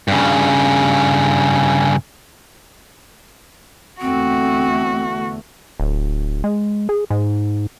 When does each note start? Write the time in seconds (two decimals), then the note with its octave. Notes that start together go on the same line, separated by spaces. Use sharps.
0.08 G2 C#3
4.01 E2 D3 A3 C4 F#4
5.80 D1
6.44 G#3
6.89 G#4
7.10 G#2